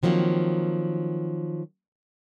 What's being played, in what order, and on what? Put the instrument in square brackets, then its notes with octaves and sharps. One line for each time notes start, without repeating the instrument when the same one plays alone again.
[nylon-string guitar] D#3 F3 F#3 A#3 C4